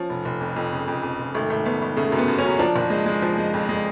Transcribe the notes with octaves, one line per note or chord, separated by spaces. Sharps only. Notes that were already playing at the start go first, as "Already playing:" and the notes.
Already playing: F3 C#4
F1
F1
F2
F2
C#3
F2
F2
F1
G#1 A3
G#1 A3
G#1 B3
G#1
C#3 A3
F#2
B3
F#2
C#4
F#3
F3 D4
F#1
G#3
G#3
F3
G#3
F2
G#3